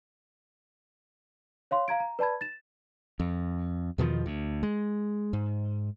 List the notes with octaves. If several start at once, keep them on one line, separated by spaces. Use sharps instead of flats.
C#5 F5 C6
F5 A#5 G#6 D7
A#5
B4 D5 A5 B5 G#6
A6 E7
F2
E2 B2 D#3 F3
D2
G#3
G#2